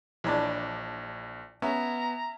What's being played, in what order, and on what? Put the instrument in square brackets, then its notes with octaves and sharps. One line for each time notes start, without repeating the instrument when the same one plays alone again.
[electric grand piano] A#1 [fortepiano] E3 D4 [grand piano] C#5 D#5 B5
[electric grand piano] B3 [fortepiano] C#4 [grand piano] E5 [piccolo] A#5